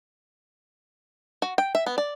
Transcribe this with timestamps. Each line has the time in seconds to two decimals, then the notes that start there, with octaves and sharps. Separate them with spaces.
1.42 F#4
1.58 G5
1.75 E5
1.86 B3
1.98 D5